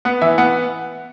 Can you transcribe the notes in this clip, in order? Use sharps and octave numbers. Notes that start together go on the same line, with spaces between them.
B3 F#5
E3 E5
B3 F#5